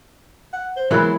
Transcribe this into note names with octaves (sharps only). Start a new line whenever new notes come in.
F#5
C5
E3 F#3 G#3 B3 E4 A#4 B5